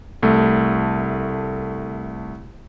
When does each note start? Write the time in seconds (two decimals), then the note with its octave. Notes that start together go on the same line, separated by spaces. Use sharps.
0.23 C2 A3